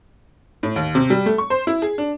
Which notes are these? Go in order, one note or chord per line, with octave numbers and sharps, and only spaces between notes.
A2
D#2
C3
G3
A3
C#6
C5
E4
G#4
D4